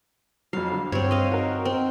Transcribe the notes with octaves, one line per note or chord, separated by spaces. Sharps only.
F2 F#3 F5
D3
G2 C4 C#5
D#5 F5
D#4 F#4 A#4
C4